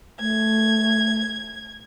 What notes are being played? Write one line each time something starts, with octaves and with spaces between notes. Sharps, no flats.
A3 G#6